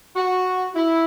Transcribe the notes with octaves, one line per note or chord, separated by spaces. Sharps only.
F#4
E4